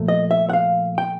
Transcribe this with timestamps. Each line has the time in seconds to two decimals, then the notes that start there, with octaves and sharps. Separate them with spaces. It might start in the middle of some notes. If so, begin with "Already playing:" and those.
Already playing: A#2 F3 A3
0.08 D#5
0.31 E5
0.49 F#5
0.53 F5
0.98 G5